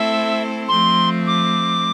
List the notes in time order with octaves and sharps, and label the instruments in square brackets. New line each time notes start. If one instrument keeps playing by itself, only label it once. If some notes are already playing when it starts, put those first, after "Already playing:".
Already playing: [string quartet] A3 C4 E4 A4 C5 [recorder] E5
[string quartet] F3 A3 C4 [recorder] C6
[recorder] D6